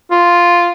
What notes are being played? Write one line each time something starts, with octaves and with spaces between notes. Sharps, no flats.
F4